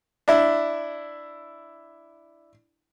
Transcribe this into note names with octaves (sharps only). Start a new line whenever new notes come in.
D4 E4